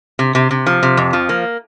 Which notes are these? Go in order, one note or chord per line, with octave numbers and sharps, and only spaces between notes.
C3
C3
C3
F3
C3
F2
F3
A#3